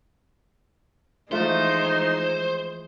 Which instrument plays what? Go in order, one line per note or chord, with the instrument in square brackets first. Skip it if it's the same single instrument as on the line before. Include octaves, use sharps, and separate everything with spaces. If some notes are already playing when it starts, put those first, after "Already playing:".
[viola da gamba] E3 G#3 [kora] F3 A3 F4 [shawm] D#4 [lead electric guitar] C5